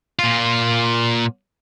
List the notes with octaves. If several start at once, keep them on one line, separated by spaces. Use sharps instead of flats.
A#2 F4